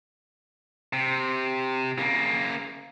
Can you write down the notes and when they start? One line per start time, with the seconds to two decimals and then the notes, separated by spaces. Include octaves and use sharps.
0.93 C3
1.98 C#3 A#3